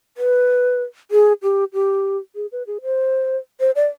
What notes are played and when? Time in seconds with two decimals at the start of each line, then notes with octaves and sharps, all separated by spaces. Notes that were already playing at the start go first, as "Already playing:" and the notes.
0.17 B4
1.11 G#4
1.43 G4
1.74 G4
2.35 G#4
2.52 B4
2.67 G#4
2.82 C5
3.60 C5
3.76 D5